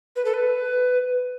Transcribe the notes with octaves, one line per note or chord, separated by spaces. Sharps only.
B4
A4
B4